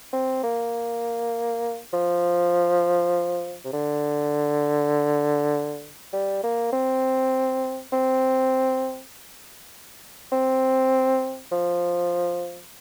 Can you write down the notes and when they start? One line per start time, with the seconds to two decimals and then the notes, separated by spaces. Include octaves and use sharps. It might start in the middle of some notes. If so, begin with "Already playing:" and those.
0.13 C4
0.44 A#3
1.94 F3
3.65 C3
3.73 D3
6.13 G3
6.43 A#3
6.73 C4
7.93 C4
10.32 C4
11.52 F3